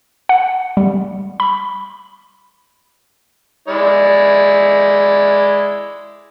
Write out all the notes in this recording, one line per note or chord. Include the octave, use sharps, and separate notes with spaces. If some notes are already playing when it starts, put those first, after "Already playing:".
F#5
G3
B5
G#3 E4 D5